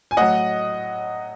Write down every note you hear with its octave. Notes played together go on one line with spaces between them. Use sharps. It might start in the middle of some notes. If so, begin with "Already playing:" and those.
G#5
A2 F#3 D#5 F#5